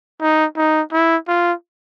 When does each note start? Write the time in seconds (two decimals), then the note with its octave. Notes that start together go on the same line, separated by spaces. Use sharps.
0.20 D#4
0.57 D#4
0.92 E4
1.28 F4